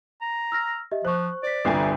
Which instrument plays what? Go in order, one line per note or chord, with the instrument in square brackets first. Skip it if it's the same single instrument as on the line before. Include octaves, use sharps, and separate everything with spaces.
[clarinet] A#5
[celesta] E6 F6 A#6
G4 D#5 E5
[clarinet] F3 [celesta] C5 C#6 [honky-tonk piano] F#6
[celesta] C5 B6 [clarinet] D5
[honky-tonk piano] G1 C2 G#5 [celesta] D4 F4 C7